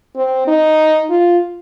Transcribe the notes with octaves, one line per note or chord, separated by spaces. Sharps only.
C4
D#4
F4